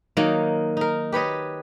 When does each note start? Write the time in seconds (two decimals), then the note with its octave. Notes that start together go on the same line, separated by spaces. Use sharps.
0.17 D#3 F#3 A#3 D#4
0.77 D#4 A#4
1.12 G4 B4 C#5 D#5